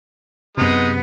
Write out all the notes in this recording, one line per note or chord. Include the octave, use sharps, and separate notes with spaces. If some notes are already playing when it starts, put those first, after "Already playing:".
F#2 C3 G#3 B3 D#4 D#6